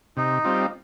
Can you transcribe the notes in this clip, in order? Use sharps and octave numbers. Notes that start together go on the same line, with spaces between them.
C3 D#4
G3 C4 F4